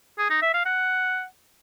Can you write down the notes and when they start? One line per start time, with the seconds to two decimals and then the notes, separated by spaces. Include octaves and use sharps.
0.18 G#4
0.30 D#4
0.42 E5
0.54 F5
0.66 F#5